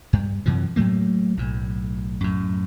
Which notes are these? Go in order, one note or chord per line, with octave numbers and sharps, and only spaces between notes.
G2
F#2 C3 E3 F3
A2 F#3 A3 A#3
B1 A2
F#2 A2